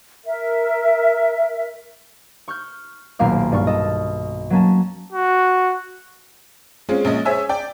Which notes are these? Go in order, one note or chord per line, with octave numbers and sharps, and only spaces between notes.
A#4 E5
C#6 F6 G6
D#1 B1 A#2 A#3 F5 D6
G2 D5 C#6 F6
A4 D#5
F#3 A#3 C#4 A5
F#4
G#3 C4 C#4 F4 G#4
A#1 G#3 C#4 D#5
G#4 C5 C#5 E5 G#5 E6
D5 G5